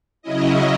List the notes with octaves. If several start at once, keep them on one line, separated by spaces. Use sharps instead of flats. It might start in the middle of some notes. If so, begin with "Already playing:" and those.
C#3 F#3 C#4 E4 D#5